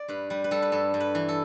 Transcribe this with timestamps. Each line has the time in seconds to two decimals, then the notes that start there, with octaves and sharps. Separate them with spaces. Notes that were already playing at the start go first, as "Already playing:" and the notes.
Already playing: D5
0.08 G2 B4
0.30 G3 B4
0.44 B4
0.51 G3 A4
0.62 B4
0.72 G2 A4
0.94 G2
1.00 B4
1.15 E3
1.28 A4